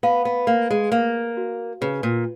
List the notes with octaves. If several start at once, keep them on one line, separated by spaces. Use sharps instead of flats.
B3 F5
B3
A#3 F5
G#3
A#3 F5
F#4
C#3 B4
A#2